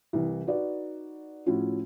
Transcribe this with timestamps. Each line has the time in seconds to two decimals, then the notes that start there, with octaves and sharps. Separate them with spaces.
0.13 C2 E3
0.47 D#4 F#4 B4 D5
1.46 A2 F3 C#4 E4 F#4